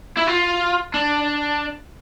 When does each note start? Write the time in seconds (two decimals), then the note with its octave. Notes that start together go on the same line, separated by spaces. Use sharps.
0.17 E4
0.27 F4
0.94 D4